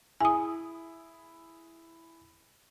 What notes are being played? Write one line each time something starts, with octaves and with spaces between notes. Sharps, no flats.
E4 G#4 G#5 D#6